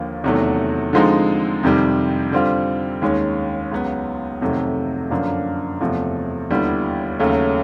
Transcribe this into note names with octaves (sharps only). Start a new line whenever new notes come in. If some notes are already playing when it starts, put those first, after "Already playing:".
Already playing: D#2 D3 F3 A#3
E2 C3 D#3 F#3 A3
D3 F3 G#3 C4 D#4
F2 C3 D#3 G3
D3 G3 C4 F4
D#2 D#3 G#3 C#4
C#2 C#3 F#3 B3
F2 C3 D#3 F#3 A3
F#2 D3 F3 A#3 D4
E2 C3 F3 A3
D#2 D3 G3 B3 E4
D#2 C#3 F#3 A3 C#4